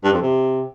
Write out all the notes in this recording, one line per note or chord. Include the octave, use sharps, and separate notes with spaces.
G2
F2
C3